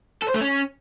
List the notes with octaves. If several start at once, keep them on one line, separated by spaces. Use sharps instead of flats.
A4
C5
A3
C#4